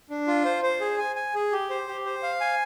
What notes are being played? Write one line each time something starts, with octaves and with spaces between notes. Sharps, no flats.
D4
F4
C5
C5
G#4
G#5
G#5
G#4
G4
C5
G4
C5
F5
G#5